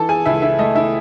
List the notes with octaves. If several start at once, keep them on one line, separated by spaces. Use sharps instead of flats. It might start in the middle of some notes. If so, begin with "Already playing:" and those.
Already playing: E3 A4 A5
G#4 G#5
C#2 E4 E5
E4 E5
A3 D#5
E4 E5